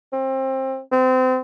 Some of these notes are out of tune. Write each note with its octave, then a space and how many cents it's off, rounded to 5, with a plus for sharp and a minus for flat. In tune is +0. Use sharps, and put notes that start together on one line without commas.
C4 +25
C4 -30